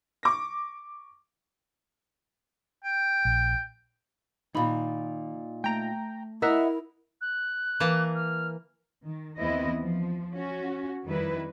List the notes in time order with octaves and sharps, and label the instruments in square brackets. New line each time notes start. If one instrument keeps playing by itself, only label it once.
[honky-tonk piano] C#6 D6 A#6
[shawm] G5
[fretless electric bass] A#1
[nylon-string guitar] A#2 D#4 [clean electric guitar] D#3 B5
[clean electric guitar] A3 [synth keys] G5 A#5
[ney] E4 [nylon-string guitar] A#4 [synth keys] D#5 E5 F#5
[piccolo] F#6
[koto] E3 A#3 A5
[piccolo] F6
[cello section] D#3
D#2 E3 B3 C4 E4 D#5
F3
C#4 F#4
F2 D#3 G3 E4 B4